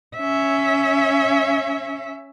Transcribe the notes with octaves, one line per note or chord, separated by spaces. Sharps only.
C#4 E5